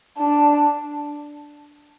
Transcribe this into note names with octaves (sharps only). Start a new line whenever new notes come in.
D4